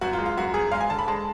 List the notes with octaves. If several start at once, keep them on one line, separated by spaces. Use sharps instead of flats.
F#2 F#4
F4
G#3
F4
F#2 F#4
F#2 G#4
G#3 F5
G#5
D3 A5
B5
G#3 A5